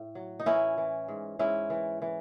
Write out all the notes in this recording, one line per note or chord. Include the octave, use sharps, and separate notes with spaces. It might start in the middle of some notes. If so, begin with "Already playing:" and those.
Already playing: A2
F#3
D#4
E3 C#4 E4
E3
G#2
G#2 C#4 E4
E3
E3